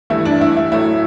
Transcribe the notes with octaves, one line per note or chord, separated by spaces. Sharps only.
G2 E3 A3 E4
D4
E4
E4
A2 F#3 A3 E4